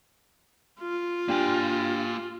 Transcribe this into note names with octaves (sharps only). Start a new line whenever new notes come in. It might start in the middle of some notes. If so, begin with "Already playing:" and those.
F4
A#3 D4 G4 G#5